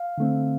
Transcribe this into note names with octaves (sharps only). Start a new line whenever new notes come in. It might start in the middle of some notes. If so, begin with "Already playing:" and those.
Already playing: F5
D3 A3 C4